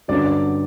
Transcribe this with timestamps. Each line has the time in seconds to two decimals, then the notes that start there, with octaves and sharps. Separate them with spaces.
0.08 G2 D3 F#3 C#4 D5
0.26 D5